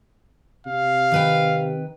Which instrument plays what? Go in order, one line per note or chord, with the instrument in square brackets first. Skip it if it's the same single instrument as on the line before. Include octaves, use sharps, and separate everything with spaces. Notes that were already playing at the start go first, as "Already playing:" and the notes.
[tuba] C3 [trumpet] F5
[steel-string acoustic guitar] D#3 B4 G5